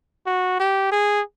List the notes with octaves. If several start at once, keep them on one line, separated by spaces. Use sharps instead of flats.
F#4
G4
G#4